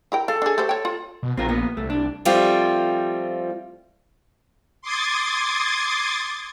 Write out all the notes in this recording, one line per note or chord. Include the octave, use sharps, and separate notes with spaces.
E4 A#4 G5
A4 F5
D4 G#4
A3 G4 C5
C#5 G5
F4
B2
A#1 C4 F4 A#4
A#3 B3
C2 A3
D4
F3 G3 A3 C4 F4 G4
C6 D6 D#6 G#6 A6